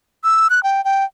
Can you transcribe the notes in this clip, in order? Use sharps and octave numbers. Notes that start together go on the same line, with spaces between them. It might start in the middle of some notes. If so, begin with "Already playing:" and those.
E6
F#6
G5
G5